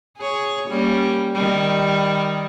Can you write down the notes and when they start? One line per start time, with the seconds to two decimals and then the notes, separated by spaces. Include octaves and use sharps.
0.18 G#4 C#5
0.68 G3 A#3 C#4
1.34 D#3 G3